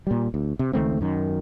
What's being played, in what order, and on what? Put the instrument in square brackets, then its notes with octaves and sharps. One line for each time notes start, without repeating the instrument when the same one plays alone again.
[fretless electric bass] A#2 G3
D2
C3
C#2 D#3 A3 C4
F#2 D#3